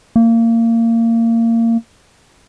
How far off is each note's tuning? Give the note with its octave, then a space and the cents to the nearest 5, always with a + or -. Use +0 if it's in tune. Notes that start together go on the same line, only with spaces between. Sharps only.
A#3 -25